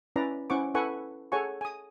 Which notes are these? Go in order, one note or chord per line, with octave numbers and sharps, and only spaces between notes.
C#4 E4 B4 D5 A#5
C#4 E4 C5 F#5 C#6 D6
E4 A4 B4 F#5 G#5 C#6
G#4 A4 C#5 F#5 G#5 C#6
G#5 D#6